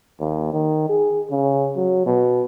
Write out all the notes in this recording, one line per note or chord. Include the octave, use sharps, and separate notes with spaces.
D#2
D#3
G#4
C#3
F#3
B2